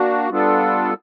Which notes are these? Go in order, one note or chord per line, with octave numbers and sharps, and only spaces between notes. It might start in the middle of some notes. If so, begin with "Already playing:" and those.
Already playing: A#3 D4 F#4
G3 B3 D4 F4 A4